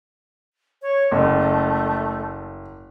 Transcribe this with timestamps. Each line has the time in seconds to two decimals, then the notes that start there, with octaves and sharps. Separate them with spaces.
0.82 C#5
1.11 F#1 A3